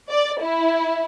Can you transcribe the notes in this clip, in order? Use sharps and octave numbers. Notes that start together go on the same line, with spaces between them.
D5
E4